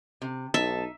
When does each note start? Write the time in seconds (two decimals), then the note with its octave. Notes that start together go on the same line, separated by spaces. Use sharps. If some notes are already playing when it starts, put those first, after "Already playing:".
0.22 C3
0.54 B1 D#4 E5 A5